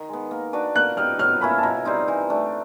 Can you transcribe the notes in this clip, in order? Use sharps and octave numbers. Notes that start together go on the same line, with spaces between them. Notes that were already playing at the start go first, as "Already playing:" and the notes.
Already playing: D#3
G#3 B3
A#3
D4 F#4 B4
A#3 F#6
D#4 G4 B4 F6
F#3 F6
A#3 C#4 E4 B5
A5
B2 A#5
G3 C4 D#4
E3
A3 D4